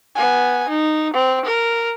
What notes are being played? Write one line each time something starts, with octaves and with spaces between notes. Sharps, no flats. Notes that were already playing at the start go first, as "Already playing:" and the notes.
B3 G#5
D#4
C4
A#4